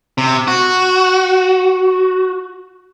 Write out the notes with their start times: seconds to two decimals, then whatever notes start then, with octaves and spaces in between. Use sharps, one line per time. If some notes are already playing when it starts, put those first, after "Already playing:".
0.18 C3
0.48 F#4